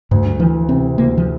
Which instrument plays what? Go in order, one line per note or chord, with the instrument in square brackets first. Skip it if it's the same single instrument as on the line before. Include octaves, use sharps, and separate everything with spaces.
[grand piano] D2 [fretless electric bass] G2
[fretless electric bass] G2
[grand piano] E3 [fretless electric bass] F3
[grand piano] C3 [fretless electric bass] C4
[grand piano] D2 [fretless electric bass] A#3
[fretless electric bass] F3